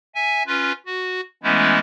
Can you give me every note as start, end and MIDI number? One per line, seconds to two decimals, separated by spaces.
0.15 0.43 76
0.15 0.43 80
0.47 0.72 61
0.47 0.72 65
0.47 0.72 71
0.86 1.21 66
1.43 1.79 52
1.43 1.79 56
1.43 1.79 57
1.43 1.79 59
1.43 1.79 61
1.43 1.79 64